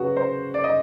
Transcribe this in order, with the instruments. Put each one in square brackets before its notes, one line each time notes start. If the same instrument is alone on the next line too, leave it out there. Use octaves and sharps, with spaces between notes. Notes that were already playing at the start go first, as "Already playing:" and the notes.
Already playing: [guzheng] C#3 F#3 B3 [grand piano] F#4
[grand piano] C5
D5
D#5